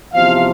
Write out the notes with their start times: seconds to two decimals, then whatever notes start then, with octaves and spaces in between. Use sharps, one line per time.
0.13 E2 C3 F3 F5